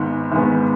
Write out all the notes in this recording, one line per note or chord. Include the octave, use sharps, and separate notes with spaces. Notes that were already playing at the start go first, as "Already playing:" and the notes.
Already playing: G#1 G#2 D#3 G#3 B3
G#1 G#2 D#3 G#3 B3